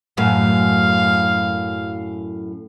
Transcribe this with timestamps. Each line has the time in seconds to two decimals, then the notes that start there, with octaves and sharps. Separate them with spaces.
0.17 F#2 A2 F5